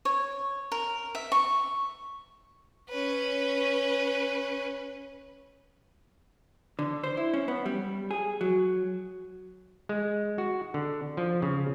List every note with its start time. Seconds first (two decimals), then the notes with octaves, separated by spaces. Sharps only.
0.05 C#5
0.72 A#4
1.15 E5
1.32 C#6
2.90 C#4 B4
6.79 D3
7.04 C5
7.17 E4
7.34 C#4
7.48 B3
7.66 G3
8.11 G#4
8.41 F#3
9.89 G#3
10.38 F#4
10.74 D3
11.17 F3
11.42 C#3